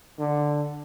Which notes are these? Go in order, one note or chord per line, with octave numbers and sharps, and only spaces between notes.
D3